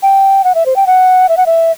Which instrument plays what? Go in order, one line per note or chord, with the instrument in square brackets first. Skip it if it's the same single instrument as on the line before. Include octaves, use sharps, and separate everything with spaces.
[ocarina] G5
F#5
E5
C5
G5
F#5
E5
F#5
E5